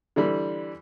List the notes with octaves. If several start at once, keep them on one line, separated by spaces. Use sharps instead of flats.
D3 E3 G3